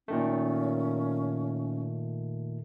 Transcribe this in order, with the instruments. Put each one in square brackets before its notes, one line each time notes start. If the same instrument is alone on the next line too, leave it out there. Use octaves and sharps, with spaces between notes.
[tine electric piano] A#2 D#3 A3 [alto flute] C#4